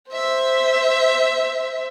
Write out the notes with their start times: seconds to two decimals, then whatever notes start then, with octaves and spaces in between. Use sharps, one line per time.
0.10 C5 E5